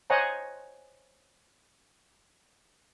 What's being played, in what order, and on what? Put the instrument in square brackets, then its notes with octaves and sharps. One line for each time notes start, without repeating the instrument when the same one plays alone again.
[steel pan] C5 C#5 D#5 F#5 G#5 A#5